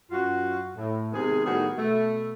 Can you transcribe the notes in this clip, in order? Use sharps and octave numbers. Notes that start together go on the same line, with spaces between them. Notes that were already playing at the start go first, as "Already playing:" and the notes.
F#2 F4 F#4
A2
C3 D#3 G#3 B3 G#4
A2 D#3 G3 B3 F#4 G#4
B2 A3